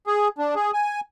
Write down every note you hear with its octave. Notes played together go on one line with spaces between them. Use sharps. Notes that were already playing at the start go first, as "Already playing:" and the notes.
G#4
D4
G#4
G#5